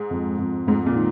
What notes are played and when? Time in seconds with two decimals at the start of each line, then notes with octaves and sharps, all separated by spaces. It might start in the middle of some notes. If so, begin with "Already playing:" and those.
Already playing: G#2 G#3
0.11 F2
0.39 F2
0.67 F2 G#2
0.86 A#2
0.96 D#3